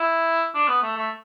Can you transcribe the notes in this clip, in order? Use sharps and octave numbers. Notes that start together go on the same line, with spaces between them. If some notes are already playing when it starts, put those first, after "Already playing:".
Already playing: E4
D4
B3
A3
A3